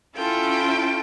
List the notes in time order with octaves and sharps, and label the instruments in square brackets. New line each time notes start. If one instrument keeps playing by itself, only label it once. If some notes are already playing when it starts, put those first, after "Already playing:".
[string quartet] C#4 E4 F4 A4 G5